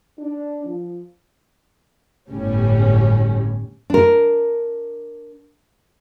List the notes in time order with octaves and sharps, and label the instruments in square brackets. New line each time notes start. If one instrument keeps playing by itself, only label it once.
[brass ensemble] D4
F3
[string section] G1 A2 G3 C#4
[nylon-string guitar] D4 A#4